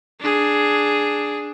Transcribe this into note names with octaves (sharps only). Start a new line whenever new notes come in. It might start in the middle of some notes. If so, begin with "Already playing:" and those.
D4 G#4